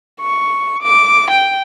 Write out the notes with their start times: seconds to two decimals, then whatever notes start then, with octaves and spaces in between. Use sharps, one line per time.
0.21 C#6
0.83 D6
1.31 G5